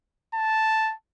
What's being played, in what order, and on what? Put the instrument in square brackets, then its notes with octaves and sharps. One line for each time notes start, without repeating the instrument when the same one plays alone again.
[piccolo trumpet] A5